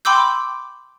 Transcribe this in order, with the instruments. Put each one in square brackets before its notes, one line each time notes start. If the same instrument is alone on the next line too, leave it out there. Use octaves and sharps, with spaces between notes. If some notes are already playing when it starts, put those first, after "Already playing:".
[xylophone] G5 B5 C6 D6 E6 G6